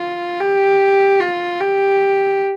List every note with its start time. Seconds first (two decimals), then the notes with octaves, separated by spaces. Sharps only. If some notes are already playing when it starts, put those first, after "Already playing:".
Already playing: F4
0.40 G4
1.20 F4
1.60 G4